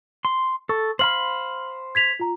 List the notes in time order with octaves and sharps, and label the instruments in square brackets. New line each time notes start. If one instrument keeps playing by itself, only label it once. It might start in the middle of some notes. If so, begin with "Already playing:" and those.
[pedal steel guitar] C6
[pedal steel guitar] A4 [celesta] C#6
[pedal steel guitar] C5 F5 B5 [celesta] C6 F6 F#7
[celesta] G#6 B6 F7
F4 A#5